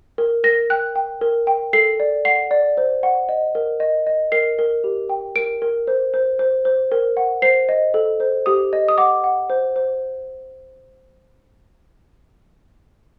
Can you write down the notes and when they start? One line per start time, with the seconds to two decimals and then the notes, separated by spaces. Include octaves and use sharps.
0.18 A#4
0.44 A#4 A#6
0.70 G5 F#6
0.96 G5
1.21 A#4
1.47 G5
1.73 A4 C7
2.00 D5
2.25 F#5 C7
2.51 D5
2.77 C5
3.03 F#5
3.29 D#5
3.55 A#4
3.80 D#5
4.07 D#5
4.32 A#4 C7
4.59 A#4
4.84 G4
5.09 G5
5.36 A#4 D7
5.62 A#4
5.87 C5
6.14 C5
6.39 C5
6.65 C5
6.92 A#4
7.17 F#5
7.42 C5 C7
7.69 D#5
7.94 A4
8.20 C5
8.46 G4 D#6
8.73 D#5
8.88 D#6
8.98 F#5 D6
9.24 F#5
9.50 C5
9.76 C5